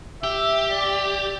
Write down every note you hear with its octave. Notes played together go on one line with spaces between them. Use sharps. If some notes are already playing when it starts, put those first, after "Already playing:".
G4 E5
D5